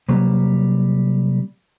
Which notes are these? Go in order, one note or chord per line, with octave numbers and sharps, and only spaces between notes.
C3 F#3 G3 A#3